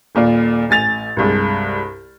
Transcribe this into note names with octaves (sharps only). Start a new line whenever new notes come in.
D#1 A#2 F4 D5
A1 G#5 A6 F7
C2 G2 G#3